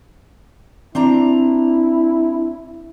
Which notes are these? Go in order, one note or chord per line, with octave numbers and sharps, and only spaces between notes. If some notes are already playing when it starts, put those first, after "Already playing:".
C4 D4 E4 A#5